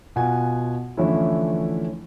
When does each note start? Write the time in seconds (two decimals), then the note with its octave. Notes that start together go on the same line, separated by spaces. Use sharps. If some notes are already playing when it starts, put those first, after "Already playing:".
0.16 B2 F4 F#5 G#5
0.97 D3 E3 F3 A3 C#4 E4